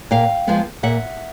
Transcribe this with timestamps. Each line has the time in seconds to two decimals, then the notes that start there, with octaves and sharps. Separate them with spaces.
0.11 A#2 F5 G5
0.47 F3 G#3 B3
0.83 A#2 E5 F#5